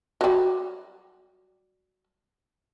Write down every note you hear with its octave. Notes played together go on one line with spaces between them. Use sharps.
F#3 G3